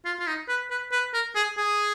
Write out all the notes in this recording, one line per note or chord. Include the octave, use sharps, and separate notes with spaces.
F4
F4
D#4
B4
B4
B4
A#4
G#4
G#4